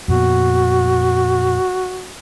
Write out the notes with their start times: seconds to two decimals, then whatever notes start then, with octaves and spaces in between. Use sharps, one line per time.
0.08 F2 A#2 B3 F#4